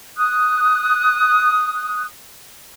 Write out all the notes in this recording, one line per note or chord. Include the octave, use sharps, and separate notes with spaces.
D#6 F#6